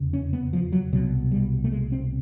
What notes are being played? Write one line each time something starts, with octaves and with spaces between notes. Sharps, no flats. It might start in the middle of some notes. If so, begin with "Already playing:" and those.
Already playing: F1 E2 C#3
C#4
B3
F3
F#3
C2 B2 F#3
G3
A3
G#3
C4